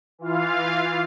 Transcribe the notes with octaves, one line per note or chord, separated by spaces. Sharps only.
E3 F4 F5